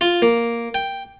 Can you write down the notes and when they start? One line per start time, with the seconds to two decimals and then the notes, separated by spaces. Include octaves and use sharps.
0.01 F4
0.22 A#3
0.74 G5